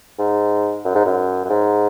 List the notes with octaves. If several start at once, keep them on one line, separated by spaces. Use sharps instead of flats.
G#2
F#2
G#2
F#2
F#2
G#2